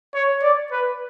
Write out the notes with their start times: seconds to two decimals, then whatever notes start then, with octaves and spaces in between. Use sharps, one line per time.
0.14 C#5
0.42 D5
0.72 B4